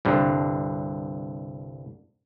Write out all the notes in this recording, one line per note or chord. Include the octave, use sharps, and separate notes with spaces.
C2 G2 D3